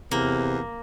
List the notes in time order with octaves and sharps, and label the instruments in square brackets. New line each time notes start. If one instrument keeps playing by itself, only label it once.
[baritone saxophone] E2 [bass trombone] C3 [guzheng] A#3